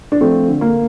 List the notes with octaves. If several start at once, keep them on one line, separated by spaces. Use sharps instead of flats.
D4
F3 A3 C4
D3
A#3